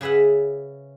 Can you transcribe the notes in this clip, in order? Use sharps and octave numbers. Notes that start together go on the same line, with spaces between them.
C#3 G#4 B4 E5 F#5